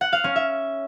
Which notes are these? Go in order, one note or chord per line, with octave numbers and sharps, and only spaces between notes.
F#5
F5
C#4
E5